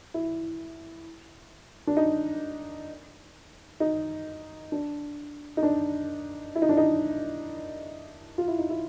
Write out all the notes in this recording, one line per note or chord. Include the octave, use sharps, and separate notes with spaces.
E4
D4
D#4
D#4
D4
D#4
D4
E4
D#4
D4
D#4
F4
E4
D#4
E4